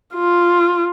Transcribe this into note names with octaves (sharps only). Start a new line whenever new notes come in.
F4